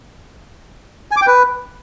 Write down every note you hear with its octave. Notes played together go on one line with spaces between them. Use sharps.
G#5
D6
G5
B4